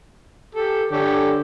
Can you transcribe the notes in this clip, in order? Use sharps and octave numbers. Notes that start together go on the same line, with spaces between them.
G4 A4
D3 G4 A4 C#5